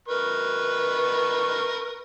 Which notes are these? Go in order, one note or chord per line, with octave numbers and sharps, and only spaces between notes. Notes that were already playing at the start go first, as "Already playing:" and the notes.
A#4 B4 C#6